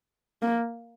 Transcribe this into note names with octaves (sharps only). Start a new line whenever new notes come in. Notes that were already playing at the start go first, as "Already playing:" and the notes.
A#3